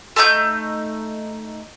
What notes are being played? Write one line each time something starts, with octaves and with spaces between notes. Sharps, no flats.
A3 D#4 G#5 G6